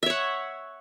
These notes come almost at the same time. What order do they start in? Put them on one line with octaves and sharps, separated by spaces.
E5 C#5 F#5